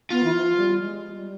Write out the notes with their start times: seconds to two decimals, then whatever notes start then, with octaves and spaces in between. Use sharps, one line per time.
0.10 B3 F4
0.23 E3
0.33 F3
0.56 G3
0.79 G#3
1.13 G3